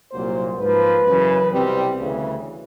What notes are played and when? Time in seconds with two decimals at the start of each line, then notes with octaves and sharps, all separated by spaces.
0.12 C2 A#2 F#3 A#3 C5
0.59 G#2 F3 A#3 B4
1.05 F#2 C#3 E3
1.52 C2 B2 G3 C4
1.98 D2 C#3 E3